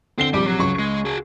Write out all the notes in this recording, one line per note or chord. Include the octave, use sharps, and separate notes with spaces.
D3 C4 C7 G7
A#1 C3 G3 D6
F#3
C#2 C#6
G#3
F#4 G#4